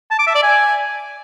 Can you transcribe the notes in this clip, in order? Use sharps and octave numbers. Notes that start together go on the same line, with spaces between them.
A5
D6
E5
D5
G#5